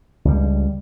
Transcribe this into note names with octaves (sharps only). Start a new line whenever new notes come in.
C#2 G3